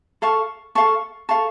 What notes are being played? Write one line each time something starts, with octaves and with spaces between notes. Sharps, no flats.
A4 F5 A5 C#6
A4 F5 A5 C#6
A4 F5 A5 C#6